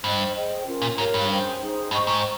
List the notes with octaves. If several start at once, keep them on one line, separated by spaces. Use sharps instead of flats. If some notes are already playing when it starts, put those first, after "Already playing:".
G2 C5 D#5 G5
G#4 C5 D#5 G5
C#4 F4 A#4
A#2
G#2 G4 A#4 C#5 F5
G2
C#4 G#4 C5 G5
D#4 G#4 C5
G2 C5 D#5 G5 C#6
G#2